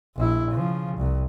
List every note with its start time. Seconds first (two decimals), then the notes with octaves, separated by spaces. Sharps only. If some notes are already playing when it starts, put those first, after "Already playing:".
0.16 A#1 E4
0.51 C#3 F3
0.97 C2